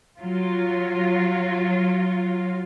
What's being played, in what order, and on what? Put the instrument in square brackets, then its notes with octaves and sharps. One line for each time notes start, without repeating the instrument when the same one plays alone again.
[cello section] F#3 F4